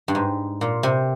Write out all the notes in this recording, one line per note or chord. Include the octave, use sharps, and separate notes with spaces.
G2
G#2
A#2
C3